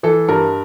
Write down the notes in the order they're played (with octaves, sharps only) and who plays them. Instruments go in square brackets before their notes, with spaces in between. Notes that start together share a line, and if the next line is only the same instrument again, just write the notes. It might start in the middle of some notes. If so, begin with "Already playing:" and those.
[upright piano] E3 A4
G2 A#4